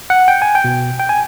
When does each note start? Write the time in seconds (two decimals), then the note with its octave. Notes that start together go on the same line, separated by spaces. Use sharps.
0.10 F#5
0.28 G5
0.42 G#5
0.55 G5
0.64 B2
1.00 G5
1.09 G#5